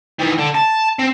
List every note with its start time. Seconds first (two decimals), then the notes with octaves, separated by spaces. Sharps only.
0.19 D#3 E3
0.38 D3
0.55 A5
0.99 C4